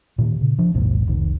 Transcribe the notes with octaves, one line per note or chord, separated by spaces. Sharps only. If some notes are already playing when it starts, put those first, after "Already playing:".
A#2 D#3
C#3
F3 D4
A#1 D#2 G#2 C3
F1 C2 D#3